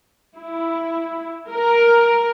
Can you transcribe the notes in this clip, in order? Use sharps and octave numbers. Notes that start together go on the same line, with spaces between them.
E4
A#4